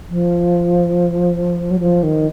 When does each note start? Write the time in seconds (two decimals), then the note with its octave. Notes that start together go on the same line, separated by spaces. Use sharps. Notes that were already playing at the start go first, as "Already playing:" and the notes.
0.09 F3
1.70 F#3
1.80 F3
2.03 D#3